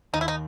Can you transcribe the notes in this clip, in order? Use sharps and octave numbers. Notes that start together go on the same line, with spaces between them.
D#2 D#4
E4
D#4